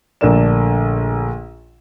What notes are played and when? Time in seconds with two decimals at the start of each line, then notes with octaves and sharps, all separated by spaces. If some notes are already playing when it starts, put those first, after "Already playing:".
0.21 A#1 D3 A3 A#4 D5 E7